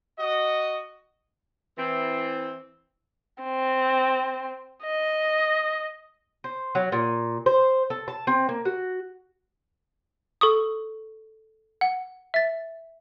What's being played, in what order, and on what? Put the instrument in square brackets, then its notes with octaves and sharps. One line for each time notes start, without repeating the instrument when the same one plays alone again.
[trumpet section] F#4 D#5
[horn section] E3 C4
[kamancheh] C4
D#5
[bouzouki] C5
F#3
A#2
C5
A4
A5
C4
A#3
F#4
[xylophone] A4 C#6 D#6
F#5
E5 A6